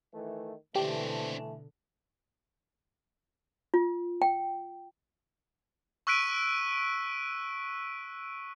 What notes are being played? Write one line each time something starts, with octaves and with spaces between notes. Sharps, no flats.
D#3 E3 A3
B2 D3 E3 A3 C4 D4 G4
F4
G5
C#6 E6 F#6 B6 D7 D#7